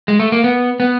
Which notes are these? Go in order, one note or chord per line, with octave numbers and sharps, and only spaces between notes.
G#3
A3
A#3
B3
B3